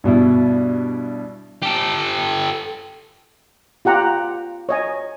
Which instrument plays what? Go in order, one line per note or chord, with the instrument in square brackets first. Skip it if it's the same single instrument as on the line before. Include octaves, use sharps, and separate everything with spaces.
[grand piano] G2 B2 E4
[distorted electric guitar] G4 A4
[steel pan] F4 G4 F#5 A#5
C#5 D#5 G#5